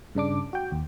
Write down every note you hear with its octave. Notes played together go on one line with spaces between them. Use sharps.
G2 C#3 D4 D6
F#4 G5
D#2